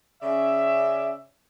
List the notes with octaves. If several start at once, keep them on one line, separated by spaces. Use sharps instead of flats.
C#3 C#4 D5 E5